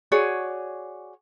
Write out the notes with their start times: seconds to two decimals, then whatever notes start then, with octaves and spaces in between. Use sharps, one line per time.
0.12 F#4 G#4 C#5 D5